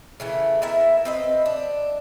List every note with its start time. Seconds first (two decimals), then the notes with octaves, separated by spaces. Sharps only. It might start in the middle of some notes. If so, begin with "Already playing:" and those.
0.20 C#3 E3 A3
0.62 B3 E4 A#4 E5
1.05 C4 B4 D#5
1.46 D4